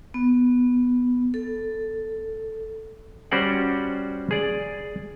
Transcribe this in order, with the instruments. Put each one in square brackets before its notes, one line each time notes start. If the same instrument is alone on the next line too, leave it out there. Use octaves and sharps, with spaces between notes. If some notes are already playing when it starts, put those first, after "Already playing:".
[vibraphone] B3
A4
[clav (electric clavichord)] G3 C#4 F#4 C5 D5 F#5
G#4 D5